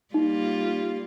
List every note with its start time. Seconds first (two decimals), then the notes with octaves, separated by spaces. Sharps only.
0.14 G3 A#3 D#4 F4